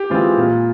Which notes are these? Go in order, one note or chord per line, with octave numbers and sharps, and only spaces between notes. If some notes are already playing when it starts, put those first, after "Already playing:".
Already playing: G4
E3 G#3 C4 F4
A#2